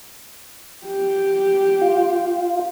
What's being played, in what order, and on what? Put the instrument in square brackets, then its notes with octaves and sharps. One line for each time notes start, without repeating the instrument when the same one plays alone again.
[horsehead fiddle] G4
[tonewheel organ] F4